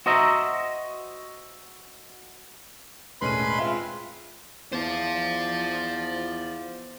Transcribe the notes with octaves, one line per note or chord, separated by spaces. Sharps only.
F#4 C5 D#5 E5 A#5
E1 A2 G#3 C#4 B4 B5 C6 D#7
G#3 C4 F4 E5
E2 C5 D5 F5